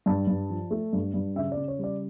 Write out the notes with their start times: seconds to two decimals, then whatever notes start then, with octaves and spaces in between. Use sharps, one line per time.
0.06 G2 A5
0.27 G2
0.50 F3
0.71 A3
0.93 G2
1.14 G2
1.36 C#3 E5
1.52 D5
1.57 C#3
1.68 C#5
1.79 G3 D5